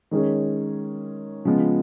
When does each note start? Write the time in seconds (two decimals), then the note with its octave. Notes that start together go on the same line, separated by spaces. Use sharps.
0.11 D#3 G#3 C#4 G#4 C#5
1.45 C#3 F3 G#3 B3 F4